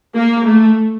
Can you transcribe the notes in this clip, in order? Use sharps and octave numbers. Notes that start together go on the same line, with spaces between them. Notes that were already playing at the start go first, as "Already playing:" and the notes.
A#3
A3